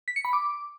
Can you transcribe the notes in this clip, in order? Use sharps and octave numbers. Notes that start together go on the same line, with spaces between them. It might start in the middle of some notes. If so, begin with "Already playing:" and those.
B6
C#7
B5
D6